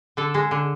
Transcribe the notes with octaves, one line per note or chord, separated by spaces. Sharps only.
D3 A4
G#3
D3